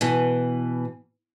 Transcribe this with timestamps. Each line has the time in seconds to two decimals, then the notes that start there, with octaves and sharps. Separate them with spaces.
0.01 B2 E3